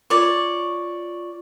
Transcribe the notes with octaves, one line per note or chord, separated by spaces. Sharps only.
F4 C#5 D5